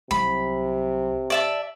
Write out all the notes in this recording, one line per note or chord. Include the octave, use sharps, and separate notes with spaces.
C2 C3 F#3 B5
D5 E5 A5